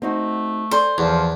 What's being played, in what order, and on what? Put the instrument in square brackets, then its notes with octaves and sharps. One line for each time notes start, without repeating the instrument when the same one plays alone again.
[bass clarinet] A3 [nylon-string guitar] C4 D#4 F#4
[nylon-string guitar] A4 D5 G#5 [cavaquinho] C5
[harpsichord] E2 [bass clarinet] F3